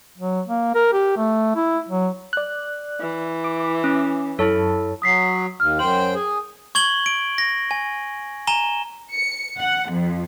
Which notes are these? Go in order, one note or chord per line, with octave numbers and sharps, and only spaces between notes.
F#3
A#3
A#4
G4
A3
E4
F#3
D5 F#6
E3
D6
C#4
F#2 E4 A4 C#5 A5
F#3 D#6 B6 C7
D#2 F6
F#2 C5 G5 F#7
G#4
C#6 G#6 F#7 G7
D7
A#6
G#5
G#5 A#5 E7 G7
C#7
F#5
F2